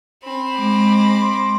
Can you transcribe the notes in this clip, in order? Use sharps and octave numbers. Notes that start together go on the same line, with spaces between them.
C4 B5
G#3 D6 A#6
C6